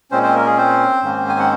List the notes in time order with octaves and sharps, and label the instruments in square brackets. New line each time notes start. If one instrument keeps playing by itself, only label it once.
[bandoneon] A#2 G#3 C4 C#4 C5
C4 C5
A#3 A#4
G#3 G#4
C4 C5
G#2 D#3 A#3 C#4
G#5
F#5